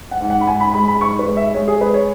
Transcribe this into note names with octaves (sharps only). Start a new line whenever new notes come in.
F#5
G#2
F#5
B5
G#2 G#5
B5
G#3 B5
B5
G#2 C#6
B4
G#3
E5
G#3 C#5
G#4
G#3 B4
C#5